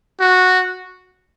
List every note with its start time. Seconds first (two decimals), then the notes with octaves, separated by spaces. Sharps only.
0.20 F#4